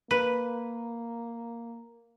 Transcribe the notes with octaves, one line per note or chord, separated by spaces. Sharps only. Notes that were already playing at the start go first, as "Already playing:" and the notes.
A#3 B4